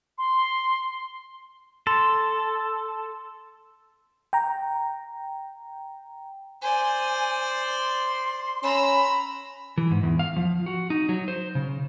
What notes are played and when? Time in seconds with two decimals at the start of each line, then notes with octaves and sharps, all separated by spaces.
0.18 C6
1.87 A4 C6
4.33 G5 A#5
6.61 C5 D5 G#5
7.49 C6
8.63 C#4 A#5 B5 E6
9.78 E3
9.91 G#2
10.03 E2
10.19 F5
10.36 F3
10.66 F#4
10.90 D#4
11.09 F#3
11.28 C5
11.55 C#3